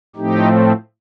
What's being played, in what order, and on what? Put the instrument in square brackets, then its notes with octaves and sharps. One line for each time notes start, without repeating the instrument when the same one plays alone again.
[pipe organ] A2 F3 A3 C4 D#4 G4